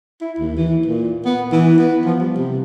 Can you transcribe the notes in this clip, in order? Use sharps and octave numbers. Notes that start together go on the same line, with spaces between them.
E4
D#2
E3
A#2
B3
E3
B3
F3
G3
C3